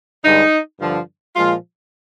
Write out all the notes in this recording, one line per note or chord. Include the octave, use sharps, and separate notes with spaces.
G2 D3 G#3 D#4
G2 D3 F3
A#2 F3 G#3 F4